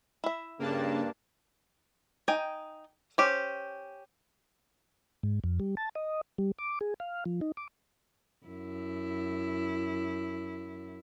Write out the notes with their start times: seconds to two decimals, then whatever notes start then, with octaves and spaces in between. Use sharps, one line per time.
0.24 E4 E5
0.60 G2 C#3 A#3 D4 A5
2.28 D#4 G5 G#5
3.18 C#4 G4 C5
5.23 G#2
5.44 F2
5.60 G3
5.77 A5
5.95 D#5
6.38 G3
6.58 D6
6.81 G#4
7.00 F5
7.26 F3
7.41 D#4
7.57 D6
8.46 F#2 E4